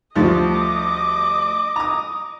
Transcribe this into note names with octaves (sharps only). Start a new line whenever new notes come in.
D2 F3 G3 D#5 D6
A#5 D#6